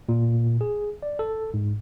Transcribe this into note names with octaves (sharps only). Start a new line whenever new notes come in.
A#2
G#4
D5
A4
G#2